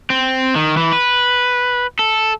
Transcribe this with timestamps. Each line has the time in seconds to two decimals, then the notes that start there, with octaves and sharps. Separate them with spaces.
0.10 C4
0.56 D#3
0.77 E3
0.93 B4
1.99 A4